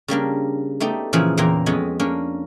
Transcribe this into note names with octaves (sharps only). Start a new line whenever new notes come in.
C#3 G3 A#3 D4
A3 B3 D#4 G4 D5
A#2 C#3 E3 F3 G#4
E2 A#2 E3 A#3 G5 A#5
F2 G#3 B3 C#4 D#5 G#5
A#3 C#4 D4